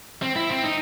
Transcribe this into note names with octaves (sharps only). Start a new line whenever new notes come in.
C4
E4
C4
D#4